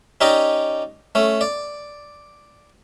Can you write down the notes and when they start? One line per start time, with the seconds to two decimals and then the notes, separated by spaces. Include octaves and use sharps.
0.21 C#4 D#4 G4 D5 D#5
1.15 A3 C#4
1.41 D5